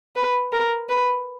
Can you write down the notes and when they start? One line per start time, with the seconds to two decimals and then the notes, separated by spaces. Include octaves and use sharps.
0.16 B4
0.52 A#4
0.89 B4